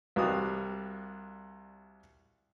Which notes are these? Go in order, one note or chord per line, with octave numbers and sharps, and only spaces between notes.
C2 G3 F#4 F5 D#6